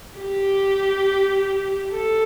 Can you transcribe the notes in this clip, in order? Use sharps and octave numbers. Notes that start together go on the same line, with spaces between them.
G4
A4